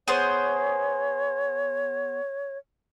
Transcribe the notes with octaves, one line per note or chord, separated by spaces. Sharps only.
B3 G#4 C5 C#5